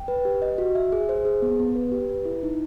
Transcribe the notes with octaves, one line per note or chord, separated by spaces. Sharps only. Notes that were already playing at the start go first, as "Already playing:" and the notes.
Already playing: G5
B4
G4
D#5
F#4
E5
G#4
C5
G#4
B3
B3
B4
G4
B4
E4
D#4